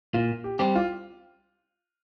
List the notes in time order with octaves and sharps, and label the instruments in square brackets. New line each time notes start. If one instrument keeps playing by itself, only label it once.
[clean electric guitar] A#2 [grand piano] F4
[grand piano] G4
[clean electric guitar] G3 C4 G4
[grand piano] F4